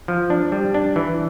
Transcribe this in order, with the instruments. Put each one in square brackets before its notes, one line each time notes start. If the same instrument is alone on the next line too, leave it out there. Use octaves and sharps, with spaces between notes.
[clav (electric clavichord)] F3
D4
G3
D4
E3